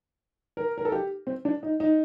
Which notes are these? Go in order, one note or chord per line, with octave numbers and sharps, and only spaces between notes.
A#4
A#4
A4
G4
C4
D4
D#4
D#4